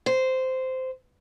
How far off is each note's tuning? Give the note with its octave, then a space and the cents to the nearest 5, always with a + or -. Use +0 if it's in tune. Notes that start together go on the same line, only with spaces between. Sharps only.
C5 -10